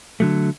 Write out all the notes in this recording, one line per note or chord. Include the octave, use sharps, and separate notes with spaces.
D3 F#3 A3